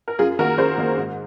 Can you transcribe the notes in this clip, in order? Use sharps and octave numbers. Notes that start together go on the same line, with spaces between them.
A#4
F#2 F4 G#4
D#3 A#3 F#4 A#4
F#2 G#4 C5
D#3 A#3
G#2